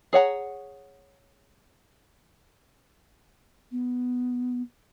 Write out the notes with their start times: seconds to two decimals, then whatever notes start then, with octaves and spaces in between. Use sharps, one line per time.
0.13 G#4 C#5 F#5 A#5
3.72 B3